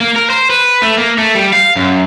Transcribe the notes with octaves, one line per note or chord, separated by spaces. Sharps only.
A#3
A#4
C5
B4
A3
A#3
A3
G3
F5
F#2